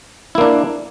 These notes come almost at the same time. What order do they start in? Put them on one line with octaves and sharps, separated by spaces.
E4 A#3 D4